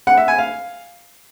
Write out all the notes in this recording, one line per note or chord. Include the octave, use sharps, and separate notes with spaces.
F#5
E5
G#5
F5